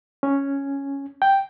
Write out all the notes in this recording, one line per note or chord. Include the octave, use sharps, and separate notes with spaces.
C#4
G5